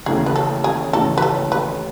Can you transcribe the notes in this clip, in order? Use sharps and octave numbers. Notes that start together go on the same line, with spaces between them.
D#2 C#3 E3 A3 C#4 G#4
B4
A4
G#4
D#2 C#3 E3 A3 C#4 A4
B4
A4
B4